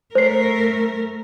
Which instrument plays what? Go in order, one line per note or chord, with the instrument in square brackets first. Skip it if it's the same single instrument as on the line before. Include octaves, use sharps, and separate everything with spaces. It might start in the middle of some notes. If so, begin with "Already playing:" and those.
[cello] A3 A#4 [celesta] C5 C7